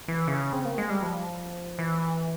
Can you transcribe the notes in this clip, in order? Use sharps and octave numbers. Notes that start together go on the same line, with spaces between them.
E3
C#3
C4
A#3
G#3
G3
F3
E3